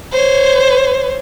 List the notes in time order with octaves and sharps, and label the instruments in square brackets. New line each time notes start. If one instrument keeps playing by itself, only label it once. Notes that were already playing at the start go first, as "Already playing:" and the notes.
[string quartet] C5 C#5